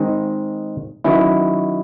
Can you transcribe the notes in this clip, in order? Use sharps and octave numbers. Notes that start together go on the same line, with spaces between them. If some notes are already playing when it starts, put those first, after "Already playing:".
Already playing: D#3 G#3 C4 D#4
D#3 F#3 C#4 E4